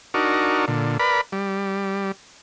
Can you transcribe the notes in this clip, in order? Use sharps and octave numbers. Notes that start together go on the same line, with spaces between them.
D4 D#4 F#4 A#4
A#2 D3
A#4 B4 D5 B5
G3